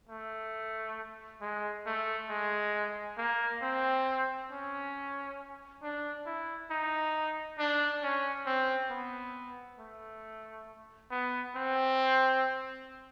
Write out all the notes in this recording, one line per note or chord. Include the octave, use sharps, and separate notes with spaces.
A3
G#3
A3
G#3
A#3
C4
C#4
D4
E4
D#4
D4
C#4
C4
B3
A3
B3
C4